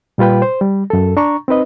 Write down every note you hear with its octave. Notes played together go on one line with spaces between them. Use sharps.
A#2 G3 F4 B4 G5
C5
G3
F#2 A4
D4 A#5 C#6
C4 D#4 B4 D#5